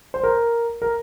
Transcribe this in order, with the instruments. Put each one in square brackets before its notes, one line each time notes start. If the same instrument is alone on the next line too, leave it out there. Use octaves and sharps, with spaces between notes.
[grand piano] C5
A#4
A#4